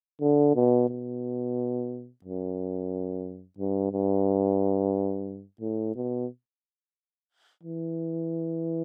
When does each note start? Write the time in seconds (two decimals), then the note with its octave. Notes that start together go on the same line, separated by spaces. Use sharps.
0.21 D3
0.55 B2
0.89 B2
2.24 F#2
3.58 G2
3.92 G2
5.61 A2
5.96 B2
7.63 E3